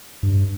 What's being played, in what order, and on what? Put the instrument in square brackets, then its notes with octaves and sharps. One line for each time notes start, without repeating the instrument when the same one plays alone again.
[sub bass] G2